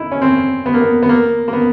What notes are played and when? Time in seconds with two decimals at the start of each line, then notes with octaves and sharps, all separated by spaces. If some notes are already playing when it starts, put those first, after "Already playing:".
Already playing: D#4 E4
0.12 C#4
0.22 C4
0.66 B3
0.74 A#3
0.81 B3
1.03 B3
1.09 A#3
1.48 A#3
1.53 B3